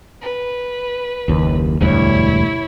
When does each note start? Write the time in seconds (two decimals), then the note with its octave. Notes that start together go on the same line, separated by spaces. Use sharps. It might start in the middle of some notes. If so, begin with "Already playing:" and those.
0.22 B4
1.28 F#1 D#2
1.81 E1 D2 G2 E4 C#5